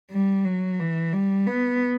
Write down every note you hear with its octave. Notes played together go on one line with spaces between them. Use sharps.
G3
F#3
E3
G3
B3